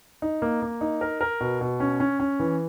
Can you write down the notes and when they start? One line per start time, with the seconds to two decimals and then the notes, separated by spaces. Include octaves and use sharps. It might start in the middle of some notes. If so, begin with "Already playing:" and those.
0.22 D#4
0.42 A#3
0.62 A#3
0.81 D#4
1.01 A#4
1.21 A#4
1.40 B2
1.61 B2
1.80 C#4
2.00 C#4
2.20 C#4
2.39 E3